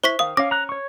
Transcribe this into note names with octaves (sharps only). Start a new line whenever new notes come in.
E4 C5 C#6 B6
D#3 F5 D#6
C#4 F5 D6 A#6
A#5 F#6
C#5 C#6